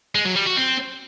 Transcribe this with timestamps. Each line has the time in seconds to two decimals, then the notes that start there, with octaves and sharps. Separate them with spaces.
0.15 G#3
0.25 F#3
0.36 G3
0.46 F#4
0.57 C4